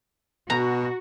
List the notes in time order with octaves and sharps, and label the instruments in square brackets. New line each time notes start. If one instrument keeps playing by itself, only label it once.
[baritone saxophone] B2 [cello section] F#4 [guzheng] A#5